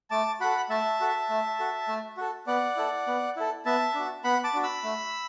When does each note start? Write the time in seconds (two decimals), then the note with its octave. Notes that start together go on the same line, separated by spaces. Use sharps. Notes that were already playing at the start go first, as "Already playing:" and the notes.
0.10 A3 A5 D6
0.40 F#4 A4 F#5 B5
0.69 A3 E5 A5
1.00 F#4 A4
1.29 A3
1.59 F#4 A4
1.88 A3
2.17 F#4 A4
2.47 B3 D5 F#5
2.77 E4 A4
3.07 B3
3.36 E4 A4
3.65 B3 E5 A5
3.94 D4 F#4
4.24 B3 F#5 B5
4.44 A5 D6
4.54 D4 F#4
4.63 B5 E6
4.83 A3